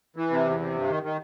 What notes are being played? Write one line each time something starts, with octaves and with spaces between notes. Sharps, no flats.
E3
C3
E2
C3
G2
D#3
D#3